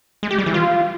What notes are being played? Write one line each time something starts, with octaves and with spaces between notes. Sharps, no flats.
G#3
G4
G3
E3
F4